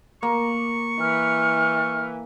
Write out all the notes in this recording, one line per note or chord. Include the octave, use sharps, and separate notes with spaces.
A#3 C#6
E3 F6